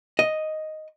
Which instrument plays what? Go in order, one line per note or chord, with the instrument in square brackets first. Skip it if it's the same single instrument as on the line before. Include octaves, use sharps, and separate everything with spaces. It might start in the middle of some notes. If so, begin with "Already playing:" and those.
[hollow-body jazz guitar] D#5